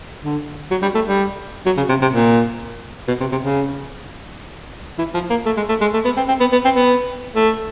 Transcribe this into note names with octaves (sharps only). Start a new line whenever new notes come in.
D3
F#3
G3
A3
G3
F#3
C#3
C3
C3
A#2
B2
C3
C3
C#3
E3
F3
A#3
A3
G#3
A3
G#3
A3
B3
C4
C4
B3
B3
C4
B3
A3